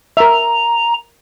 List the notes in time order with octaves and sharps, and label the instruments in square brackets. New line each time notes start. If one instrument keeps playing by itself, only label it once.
[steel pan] A#4 E5 [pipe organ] A#5